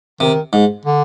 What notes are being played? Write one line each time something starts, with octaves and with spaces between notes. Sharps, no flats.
C3 D#3
G#2
D3